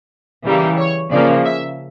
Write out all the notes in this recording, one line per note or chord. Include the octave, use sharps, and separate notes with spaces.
C#3 E3 G3 A#3
C#5
C#3 F3 A#3 D5
E5